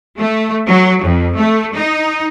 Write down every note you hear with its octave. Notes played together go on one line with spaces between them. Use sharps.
A3
F#3
F2
A3
D#4